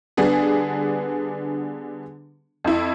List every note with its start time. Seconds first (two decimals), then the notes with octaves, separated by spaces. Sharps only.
0.17 D3 G3 B3 D4 G#4
2.64 F2 E4